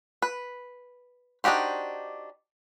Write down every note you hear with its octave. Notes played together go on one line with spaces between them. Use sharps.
B4
D4 D#4 F#4 G4 C5